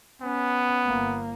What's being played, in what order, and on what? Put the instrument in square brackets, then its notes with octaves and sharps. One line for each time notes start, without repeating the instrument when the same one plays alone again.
[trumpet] B3 [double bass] C#4
[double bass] G1 A#3